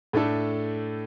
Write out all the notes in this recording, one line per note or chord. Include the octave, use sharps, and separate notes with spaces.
A2 A3 D4 A4